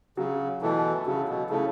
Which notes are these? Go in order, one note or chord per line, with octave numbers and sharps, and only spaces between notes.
C#3 F#3
B2 E3 A3 E4 A4
C#3 F#3
B2
C#3 A3 E4 A4